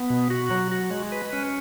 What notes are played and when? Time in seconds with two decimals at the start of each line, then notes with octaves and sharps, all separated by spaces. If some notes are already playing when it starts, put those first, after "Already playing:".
Already playing: B3
0.10 B2
0.30 F#4
0.51 F#3
0.72 F#4
0.91 G#3
1.12 B4
1.33 C#4